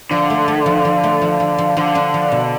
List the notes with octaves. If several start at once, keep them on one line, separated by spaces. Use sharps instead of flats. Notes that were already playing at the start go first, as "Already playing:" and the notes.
D3 F3
A3
A3
F3
F3
A3
F3
F3
F3
D3 F3
D4
F3
B2